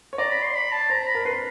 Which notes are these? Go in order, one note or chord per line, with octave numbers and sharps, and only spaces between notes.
C#5
D5 A#5
B5
C6
B5
A5
C5 A#5
B5
A#4
B4 C6